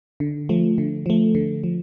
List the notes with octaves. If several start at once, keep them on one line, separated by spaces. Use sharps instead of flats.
D3
F3 A3
D3
F3 A3
D3
F3